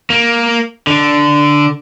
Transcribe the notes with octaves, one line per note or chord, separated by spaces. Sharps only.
A#3
D3